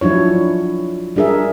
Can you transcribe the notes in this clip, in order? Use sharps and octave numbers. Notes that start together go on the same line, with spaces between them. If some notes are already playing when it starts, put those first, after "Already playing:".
F3 F#3 D4 E4 C#5
G3 D4 G#4 A#4 E5